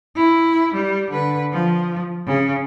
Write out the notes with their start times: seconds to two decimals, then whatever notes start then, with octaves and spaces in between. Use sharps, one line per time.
0.16 E4
0.74 G3
1.10 D3 B4
1.52 F3
2.27 C#3